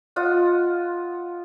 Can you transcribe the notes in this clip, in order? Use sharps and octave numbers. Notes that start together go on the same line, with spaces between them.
F4 D#5 F#5